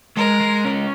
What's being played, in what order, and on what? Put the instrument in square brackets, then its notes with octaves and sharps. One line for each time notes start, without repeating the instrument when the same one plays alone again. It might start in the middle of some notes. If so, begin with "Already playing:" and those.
[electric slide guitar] G#3 [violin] A#4
[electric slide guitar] G#3
C#4